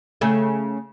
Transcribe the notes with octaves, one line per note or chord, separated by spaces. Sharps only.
C#3 A3